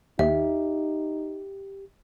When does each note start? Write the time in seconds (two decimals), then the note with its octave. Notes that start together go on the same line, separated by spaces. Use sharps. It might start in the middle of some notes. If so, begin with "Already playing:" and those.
0.19 D#2 D#4 G4 E5